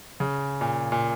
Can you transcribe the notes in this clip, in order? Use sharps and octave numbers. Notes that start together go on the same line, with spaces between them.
C#3
A#2
A#2